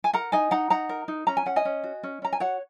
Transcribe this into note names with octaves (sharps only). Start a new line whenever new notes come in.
G#5
A#4 F#5 A#5
D#4 D#5 G#5
D#4 F#5 A#5
D#4 F#5 A#5
A#4
D#4
C#4 A#5
G#5
C#4 F#5
D#5 G#5
C#4
F#4
C#4
C#4 A#5
G#5
F#4 C#5 F#5